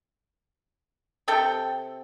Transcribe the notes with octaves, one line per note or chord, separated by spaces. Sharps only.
C3 C4 A4 G5